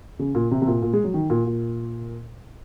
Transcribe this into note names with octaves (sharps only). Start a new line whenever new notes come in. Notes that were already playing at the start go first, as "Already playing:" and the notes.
C#3
A#2
C3
C3
A#2
A#2
G#3
F#3
D#3
A#2
A#2